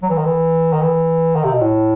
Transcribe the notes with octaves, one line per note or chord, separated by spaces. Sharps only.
F#3
E3
D#3
E3
D#3
E3
D#3
C3
B2
A2